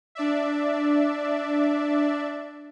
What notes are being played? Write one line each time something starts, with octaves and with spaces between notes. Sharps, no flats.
D4 D5 E5